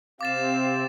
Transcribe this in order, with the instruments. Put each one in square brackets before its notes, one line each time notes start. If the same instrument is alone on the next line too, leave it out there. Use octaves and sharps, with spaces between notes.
[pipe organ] C3 C4 [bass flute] F5 [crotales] D6 A6 E7